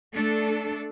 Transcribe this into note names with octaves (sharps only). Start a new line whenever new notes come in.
A3 D4 A4